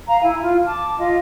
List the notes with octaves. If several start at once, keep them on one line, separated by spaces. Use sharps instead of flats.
F5 A#5
E4 G#5
F4
A5 D6
F4 D#5